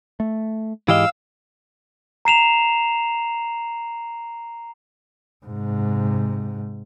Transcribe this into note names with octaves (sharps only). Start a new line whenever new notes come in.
A3
G#2 E3 G4 D#5 F5 E6
A#5 C7 E7 F7
G#2 C3